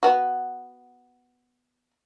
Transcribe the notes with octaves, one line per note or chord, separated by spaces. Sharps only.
B3 F#4